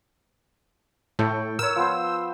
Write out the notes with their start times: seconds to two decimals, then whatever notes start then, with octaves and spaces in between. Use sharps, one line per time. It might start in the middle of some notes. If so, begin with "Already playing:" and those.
1.19 A2 A4 G5 C#6
1.59 A#4 C#5 E6
1.76 F3 B3 C5